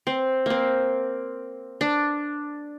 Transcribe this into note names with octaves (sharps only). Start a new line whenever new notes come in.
C4
A#3 C4
D4